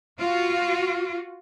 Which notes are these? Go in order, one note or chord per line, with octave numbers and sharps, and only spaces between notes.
F4 F#4